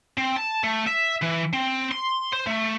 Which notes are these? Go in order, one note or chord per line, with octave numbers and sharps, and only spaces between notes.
C4
A5
A3
E5
E3
C4
C6
C5
A3